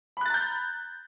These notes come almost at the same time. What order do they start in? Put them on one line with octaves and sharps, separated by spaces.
B5 F#6 A6 A#5 G6